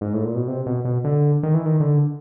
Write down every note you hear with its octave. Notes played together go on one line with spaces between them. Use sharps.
G#2
A2
A#2
B2
C3
B2
B2
D3
D#3
E3
D#3
D3